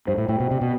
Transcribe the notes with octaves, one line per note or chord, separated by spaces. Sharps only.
G2 C5
A2
A2 G5
B2
C3 D5
B2